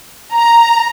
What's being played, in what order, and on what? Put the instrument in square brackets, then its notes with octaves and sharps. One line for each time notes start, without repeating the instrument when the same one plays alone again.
[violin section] A#5